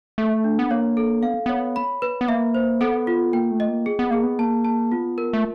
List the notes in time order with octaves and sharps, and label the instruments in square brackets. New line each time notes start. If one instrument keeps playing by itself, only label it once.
[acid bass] A3 [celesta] A4
[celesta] D4
[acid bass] B3
[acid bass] A#3 [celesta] C#5
[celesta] A4
[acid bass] B3 [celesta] F5
[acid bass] B3 [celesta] C#5
[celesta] B5
B4
[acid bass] B3
[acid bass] A#3 [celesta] E5
[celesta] C5
[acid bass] B3 [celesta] A4
[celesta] F4
[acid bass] A#3 [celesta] G5
[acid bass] A3
[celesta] D#5
[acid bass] A#3
[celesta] G#4
[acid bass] B3
[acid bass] A#3 [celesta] G#4
[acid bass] B3
[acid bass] A#3 [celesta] A5
[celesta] A5
[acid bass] B3 [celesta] F4
[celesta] A#4
[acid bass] A3